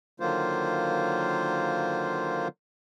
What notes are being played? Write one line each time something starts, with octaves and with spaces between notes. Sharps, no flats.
D3 D#3 F#3 A#3 F4 C5